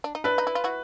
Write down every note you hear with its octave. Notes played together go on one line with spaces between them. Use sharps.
D4
D#4
D4 E4 B4
D#4
E4
F4
E4 F#4